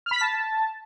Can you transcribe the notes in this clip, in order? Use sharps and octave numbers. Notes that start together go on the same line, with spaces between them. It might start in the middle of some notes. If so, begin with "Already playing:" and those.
F6
B5
B6
A5